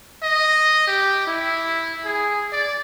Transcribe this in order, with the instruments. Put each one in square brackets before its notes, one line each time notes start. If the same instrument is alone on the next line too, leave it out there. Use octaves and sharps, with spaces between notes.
[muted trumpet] D#5
G4
E4
G#4
D5